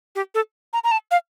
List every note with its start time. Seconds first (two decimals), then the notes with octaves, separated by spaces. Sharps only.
0.15 G4
0.34 A4
0.73 A#5
0.84 A#5
0.91 A5
1.11 F5